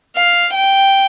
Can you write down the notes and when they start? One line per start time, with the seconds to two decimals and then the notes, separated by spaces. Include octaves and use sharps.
0.16 F5
0.54 G5